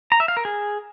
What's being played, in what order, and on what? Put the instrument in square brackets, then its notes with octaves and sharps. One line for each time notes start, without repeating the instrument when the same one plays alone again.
[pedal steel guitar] A#5
E5
F5
A#4
G#4